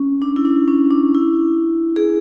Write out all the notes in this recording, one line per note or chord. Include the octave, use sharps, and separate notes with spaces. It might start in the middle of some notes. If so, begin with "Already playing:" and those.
Already playing: C#4
D4
E4
D4
C#4
D4
E4
G#4